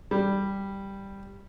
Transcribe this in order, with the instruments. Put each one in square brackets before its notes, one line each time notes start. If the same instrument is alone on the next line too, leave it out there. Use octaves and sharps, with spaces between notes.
[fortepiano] G3